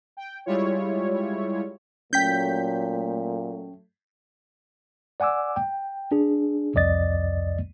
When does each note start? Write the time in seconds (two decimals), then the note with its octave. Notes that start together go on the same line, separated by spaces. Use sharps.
0.17 G5
0.46 G3 G#3 E4 F4 C#5
2.13 A#2 F#3 A3 C#4 G5 G6 B6
5.20 D5 F#5 G#5 D6 E6
5.56 G5
6.12 D4 G#4
6.74 C2 F2 D5 D#5 A6